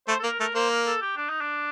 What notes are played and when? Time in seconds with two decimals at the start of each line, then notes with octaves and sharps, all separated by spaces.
0.08 A3 C5
0.20 A4
0.24 A#3 A#4
0.40 A3 A#4
0.55 A#3 C5
0.70 A#4
0.86 A4
1.02 G4
1.17 D4
1.29 D#4
1.41 D4